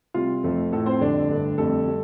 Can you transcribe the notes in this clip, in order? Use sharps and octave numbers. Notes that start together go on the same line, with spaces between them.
C3 G3 F4
F2 F3 A3
A2 F3 A3 A4
C4 C5
F2 D3 G3 D4 D5
G2 D3 A3
F2 D3 G3 A3 A4
G3